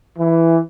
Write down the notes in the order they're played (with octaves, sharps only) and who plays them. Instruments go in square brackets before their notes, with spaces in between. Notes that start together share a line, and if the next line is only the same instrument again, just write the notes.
[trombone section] E3